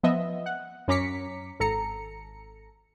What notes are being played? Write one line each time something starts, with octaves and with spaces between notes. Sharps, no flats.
F3 B3 D#5 E5
F#5
F#2 C#4 A#5 D6 B6 C#7
G#1 A4 A#5 C#7